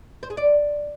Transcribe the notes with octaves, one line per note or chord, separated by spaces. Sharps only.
C5
G#4
D5